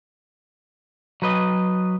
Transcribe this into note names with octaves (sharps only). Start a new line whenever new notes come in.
F#3 B4 D#5